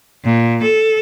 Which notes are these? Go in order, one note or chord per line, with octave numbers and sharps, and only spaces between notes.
A#2
A4